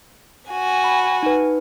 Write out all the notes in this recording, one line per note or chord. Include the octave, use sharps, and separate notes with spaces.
F#4 G#5
B5
D#4 B4